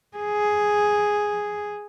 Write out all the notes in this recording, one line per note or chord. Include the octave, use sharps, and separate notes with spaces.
G#4